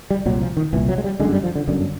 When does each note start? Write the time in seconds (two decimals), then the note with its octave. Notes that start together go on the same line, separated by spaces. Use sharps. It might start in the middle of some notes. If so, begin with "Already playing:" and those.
0.11 G3
0.26 C2 A#2 F#3
0.41 F3
0.57 D#3
0.73 C2 A#2 E3
0.89 F#3
0.98 G#3
1.04 G3
1.20 G1 F#2 D3 G#3
1.32 G3
1.43 F3
1.56 D3
1.68 G1 F#2 D3